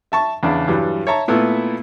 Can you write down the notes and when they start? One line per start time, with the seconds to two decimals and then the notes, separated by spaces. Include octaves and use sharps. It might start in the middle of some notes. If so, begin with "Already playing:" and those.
0.12 E5 A5 C#6
0.43 E2 C#3 D4
0.68 G2 E3 F#3 G3
1.07 C#5 E5 A5 A#5 C#6
1.28 A#2 A3 B3 E4